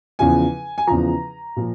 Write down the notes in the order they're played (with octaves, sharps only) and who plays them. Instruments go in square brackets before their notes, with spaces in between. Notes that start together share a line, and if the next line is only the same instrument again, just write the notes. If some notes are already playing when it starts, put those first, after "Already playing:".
[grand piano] E2 C#3 F3 G#5
G#5
E2 C#3 F3 A#5
A#2 F3